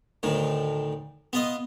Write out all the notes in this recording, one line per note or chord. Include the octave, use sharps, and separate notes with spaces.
D2 A2 D#3
B3 F4 D#5